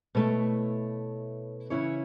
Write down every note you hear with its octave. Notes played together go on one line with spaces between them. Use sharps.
B2 A3 E4 C#5
C#3 E3 C#4 E4 C#5